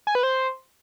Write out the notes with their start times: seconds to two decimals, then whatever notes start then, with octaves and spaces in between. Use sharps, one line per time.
0.07 G#5
0.15 B4
0.23 C5